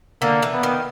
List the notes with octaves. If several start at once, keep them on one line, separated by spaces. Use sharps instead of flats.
D3 A#3
E3
B3
D#3